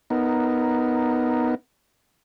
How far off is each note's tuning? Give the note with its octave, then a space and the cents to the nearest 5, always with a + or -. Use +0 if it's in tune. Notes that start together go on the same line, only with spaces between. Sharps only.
B3 +0 D#4 +0 A#4 +0